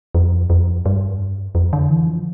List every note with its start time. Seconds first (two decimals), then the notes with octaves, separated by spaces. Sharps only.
0.15 F2
0.50 F2
0.86 G2
1.55 F2
1.73 D3
1.89 E3
2.07 F3